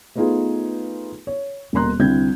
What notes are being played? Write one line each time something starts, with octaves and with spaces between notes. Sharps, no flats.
A3 B3 D#4 F4 G#4 B4
C#5
D#1 B2 A#3 A#5 C6 F#6
C2 D3 C4 E4 G6 G#6